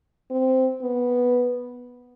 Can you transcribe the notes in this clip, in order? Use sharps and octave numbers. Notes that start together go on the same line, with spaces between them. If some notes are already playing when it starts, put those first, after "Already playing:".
C4
B3